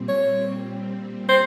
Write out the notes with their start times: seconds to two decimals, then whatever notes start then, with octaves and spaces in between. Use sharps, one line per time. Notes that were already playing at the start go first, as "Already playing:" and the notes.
Already playing: A#2 G3 C4
0.09 C#5
1.29 C5